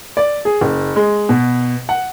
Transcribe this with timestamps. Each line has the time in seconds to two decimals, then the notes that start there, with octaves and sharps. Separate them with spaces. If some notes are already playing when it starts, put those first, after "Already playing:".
0.17 D5
0.45 G#4
0.61 F#1
0.96 G#3
1.29 B2
1.89 F#5